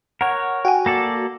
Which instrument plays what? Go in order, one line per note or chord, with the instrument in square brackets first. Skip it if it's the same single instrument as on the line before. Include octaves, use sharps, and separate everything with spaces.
[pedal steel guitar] A#4 C#5 [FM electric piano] F#5
[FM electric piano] F#4 [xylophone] G5 G#5
[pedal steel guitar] A#3 A4 D5